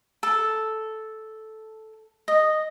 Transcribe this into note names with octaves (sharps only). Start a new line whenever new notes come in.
A4
D#5